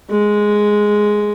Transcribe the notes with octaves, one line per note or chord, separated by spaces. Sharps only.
G#3